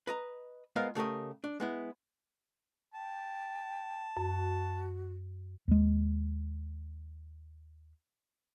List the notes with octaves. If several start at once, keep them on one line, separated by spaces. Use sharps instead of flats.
B4 D#5 A#5
G#3 B3 F4 A#4 C5 F5
C#3 A3 G4 A#4 D#5
D4
G#3 B3 E4
G5 A5
F#2 F#4
D#2 G#3